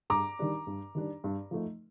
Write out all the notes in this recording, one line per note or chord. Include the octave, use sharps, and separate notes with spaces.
G2 A#5 D6
D#3 G3 D4
G2
D#3 G3 D4
G2
F3 A3 D#4